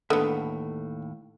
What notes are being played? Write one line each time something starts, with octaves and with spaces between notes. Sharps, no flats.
D#2 A2 D3 B3 A4